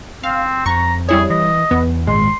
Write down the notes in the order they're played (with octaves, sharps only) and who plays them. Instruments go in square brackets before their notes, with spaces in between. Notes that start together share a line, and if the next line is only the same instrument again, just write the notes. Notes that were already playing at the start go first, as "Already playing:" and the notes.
[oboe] C4 [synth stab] F5
[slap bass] F2 [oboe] A#5 [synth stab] C#6
[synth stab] G3 E4 C#5 [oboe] G#4
[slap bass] E3 [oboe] D#5
[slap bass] E2 [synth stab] B3
[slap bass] G#1 A#2 [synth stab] G#3 [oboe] C6